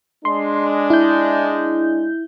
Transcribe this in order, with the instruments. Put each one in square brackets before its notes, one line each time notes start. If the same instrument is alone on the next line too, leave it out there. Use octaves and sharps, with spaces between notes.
[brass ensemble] G#3 D4 [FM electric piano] C6
[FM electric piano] E4 G6